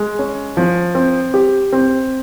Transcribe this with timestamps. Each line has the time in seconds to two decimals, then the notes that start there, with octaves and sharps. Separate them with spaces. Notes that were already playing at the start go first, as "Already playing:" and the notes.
Already playing: G#3
0.19 C#4
0.57 F3
0.95 C4
1.34 G4
1.73 C4